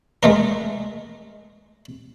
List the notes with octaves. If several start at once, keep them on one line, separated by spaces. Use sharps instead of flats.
G#3 A3 A#4